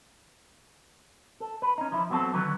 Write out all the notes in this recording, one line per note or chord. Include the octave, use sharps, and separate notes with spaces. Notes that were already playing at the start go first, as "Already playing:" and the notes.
A4
B4
C#4 D#4
F3 E4
F#3 B3 C4 E4 A4
D3 D#3 F#3 F#4 B4